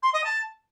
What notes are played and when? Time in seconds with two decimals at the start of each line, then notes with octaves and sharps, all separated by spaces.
0.02 C6
0.13 D#5
0.24 A5